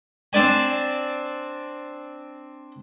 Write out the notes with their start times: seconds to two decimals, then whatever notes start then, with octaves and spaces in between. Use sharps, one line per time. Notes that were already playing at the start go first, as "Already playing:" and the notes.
0.33 C4 D4 D5 G#5